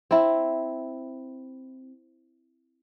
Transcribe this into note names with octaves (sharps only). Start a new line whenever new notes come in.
C4 E4